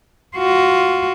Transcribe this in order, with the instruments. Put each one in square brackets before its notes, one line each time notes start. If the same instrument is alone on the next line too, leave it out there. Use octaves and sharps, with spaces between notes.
[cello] F4 F#4